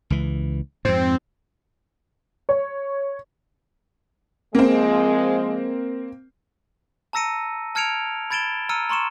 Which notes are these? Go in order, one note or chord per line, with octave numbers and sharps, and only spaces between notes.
C#2 E3
F2 G#2 C4
C#5
F3 G#3 A#3 C4
A5 A#5 E6 A#6 C#7 D#7
A5 F6 G#6 C#7 D7 F7
B5 G#6 A6 D7 E7 G7
A#5 E6 F6 C#7 D#7
A#5 C6 C#6 C#7 E7